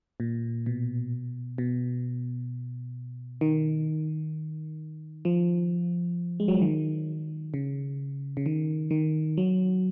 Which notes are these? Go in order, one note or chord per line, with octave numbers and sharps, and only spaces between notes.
A#2
B2
B2
D#3
F3
G#3
F#3
F3
D#3
C#3
C#3
D#3
D#3
F#3